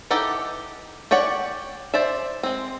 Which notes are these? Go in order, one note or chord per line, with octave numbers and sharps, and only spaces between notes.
E3 D#4 G4 A4 F#5
G4 C#5 D5 F#5
C5 D5 E5
G#3 C4